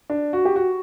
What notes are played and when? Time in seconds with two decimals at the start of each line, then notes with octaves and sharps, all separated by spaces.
0.10 D4
0.33 F#4
0.45 G4
0.56 F#4